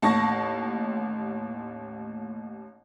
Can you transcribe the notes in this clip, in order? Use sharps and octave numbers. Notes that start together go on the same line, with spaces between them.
A1 D#2 A5 C#6 A#6